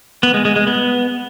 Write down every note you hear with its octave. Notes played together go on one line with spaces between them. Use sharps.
B3
G#3
G#3
G#3
B3